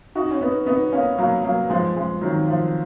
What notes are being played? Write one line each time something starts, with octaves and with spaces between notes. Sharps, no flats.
D#4 F#4
C#4
B3 D#4
B3 D#4
A#3 C#4
F#3 A#3
F#3 A#3
F3 G#3
F3 G#3
D#3 F#3
F3